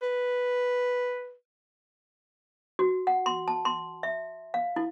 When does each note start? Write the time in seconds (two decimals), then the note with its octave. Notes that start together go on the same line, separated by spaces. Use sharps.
0.02 B4
2.79 F#4
3.07 F#5
3.26 C6
3.48 A5
3.65 C6
4.03 E5
4.54 F5
4.76 E4